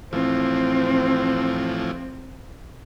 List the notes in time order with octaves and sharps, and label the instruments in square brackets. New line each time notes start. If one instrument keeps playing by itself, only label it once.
[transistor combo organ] A2 E3 F3 [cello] C4